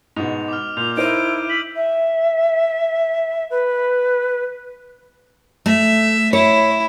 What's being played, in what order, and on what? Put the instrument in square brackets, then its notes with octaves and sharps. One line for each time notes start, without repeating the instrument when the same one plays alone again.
[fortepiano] G#2 B2 [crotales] F7
[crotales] D6 F6
[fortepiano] A#2 [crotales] D6 G6 [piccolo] F7
[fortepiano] D#4 A#4 C5 [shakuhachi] E4 [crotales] G6 D#7 [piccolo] D7
[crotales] E6 F#7 [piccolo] B6
[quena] E5
B4
[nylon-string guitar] A3 [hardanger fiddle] E5
[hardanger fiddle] E4 [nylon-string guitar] C#5